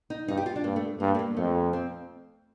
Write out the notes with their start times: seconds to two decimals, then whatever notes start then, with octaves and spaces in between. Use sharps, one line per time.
0.10 D#4
0.28 G2 D#4
0.37 G4
0.46 F4
0.56 D4
0.64 G2 A#3
0.76 A3
1.00 G2 A#3
1.15 A3
1.19 A#3
1.37 F2 A3
1.73 C4